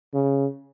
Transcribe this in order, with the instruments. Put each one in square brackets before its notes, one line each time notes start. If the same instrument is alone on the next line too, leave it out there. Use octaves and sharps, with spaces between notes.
[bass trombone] C#3